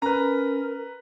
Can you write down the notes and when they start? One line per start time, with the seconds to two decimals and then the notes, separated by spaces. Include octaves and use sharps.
0.02 C#4 A#4 B4 A#5